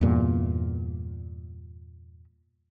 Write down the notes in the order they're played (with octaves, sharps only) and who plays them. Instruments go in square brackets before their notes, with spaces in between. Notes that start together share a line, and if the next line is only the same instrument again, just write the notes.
[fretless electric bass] E2 G2 A#2